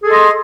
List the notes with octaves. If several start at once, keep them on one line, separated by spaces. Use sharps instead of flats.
G#4 A4 D#5 C6